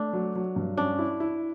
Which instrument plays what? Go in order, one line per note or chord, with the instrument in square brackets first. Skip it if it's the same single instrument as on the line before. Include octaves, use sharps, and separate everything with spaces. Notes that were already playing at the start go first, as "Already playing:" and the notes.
Already playing: [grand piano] A3 [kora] D4
[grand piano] F#3
F#3
G2
[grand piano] C#4 [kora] D4
[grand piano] E4
E4